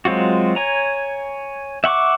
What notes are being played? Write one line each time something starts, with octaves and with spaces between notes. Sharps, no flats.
F#3 G#3 C4 F4 F#4
C#5 G#5 A#5
E5 F#5 C#6 D6